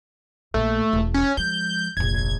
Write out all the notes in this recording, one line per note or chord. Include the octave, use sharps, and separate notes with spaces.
A#1 A3 A#3
E1
C#4
F3 G#3 G6
F1 A#1 G#6